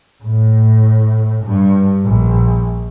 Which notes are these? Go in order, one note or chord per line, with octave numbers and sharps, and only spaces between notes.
A2
G2
A#1